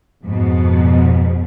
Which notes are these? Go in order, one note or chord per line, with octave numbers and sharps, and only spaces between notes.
F2 G#2 B2